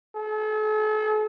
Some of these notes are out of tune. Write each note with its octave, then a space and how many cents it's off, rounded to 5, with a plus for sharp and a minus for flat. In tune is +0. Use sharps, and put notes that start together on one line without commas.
A4 -40